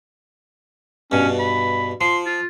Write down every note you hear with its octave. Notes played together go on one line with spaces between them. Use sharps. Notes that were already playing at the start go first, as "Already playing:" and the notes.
G2 B2 C#4
B5
F3 C6
F4